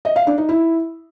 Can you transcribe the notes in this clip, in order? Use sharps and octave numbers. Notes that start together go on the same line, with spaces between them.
D#5
F5
D4
D#4
E4